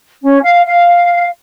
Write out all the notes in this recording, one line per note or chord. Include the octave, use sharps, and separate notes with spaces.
C#4
F5
F5